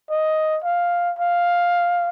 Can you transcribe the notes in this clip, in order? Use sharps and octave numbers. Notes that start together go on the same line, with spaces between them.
D#5
F5
F5